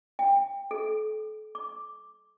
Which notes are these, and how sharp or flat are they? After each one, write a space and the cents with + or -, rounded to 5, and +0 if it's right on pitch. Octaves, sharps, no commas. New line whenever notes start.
G5 +20
A4 -35
D6 +0